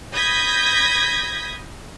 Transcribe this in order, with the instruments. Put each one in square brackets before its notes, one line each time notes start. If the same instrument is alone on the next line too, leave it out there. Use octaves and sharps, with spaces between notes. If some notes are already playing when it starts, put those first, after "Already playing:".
[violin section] B5 D#6 G6 G#6 A#6 B6